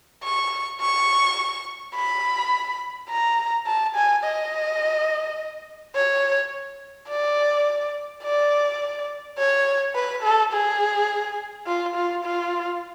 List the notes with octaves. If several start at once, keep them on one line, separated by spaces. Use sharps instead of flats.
C#6
C#6
B5
A#5
A5
G#5
D#5
C#5
D5
D5
C#5
B4
A4
G#4
F4
F4
F4